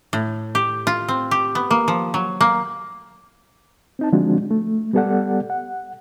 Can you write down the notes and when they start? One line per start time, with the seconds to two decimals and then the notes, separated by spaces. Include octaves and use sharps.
0.13 A2
0.55 G4
0.87 F4
1.08 C4
1.31 G4
1.55 B3
1.71 A#3
1.88 F3
2.14 F#3
2.41 A#3
3.99 C4 D#4 A5
4.12 D3 F3 G#3 C4 D4 F#4
4.51 A3
4.93 G3 B3 G4 A4 D5 F#5
5.50 F#5